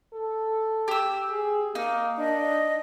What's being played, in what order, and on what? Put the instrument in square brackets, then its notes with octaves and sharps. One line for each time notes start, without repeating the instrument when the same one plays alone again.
[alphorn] A4
[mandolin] G4 E6
[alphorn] G#4
[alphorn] A#3 [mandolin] D#4
[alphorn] D4 [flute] D#5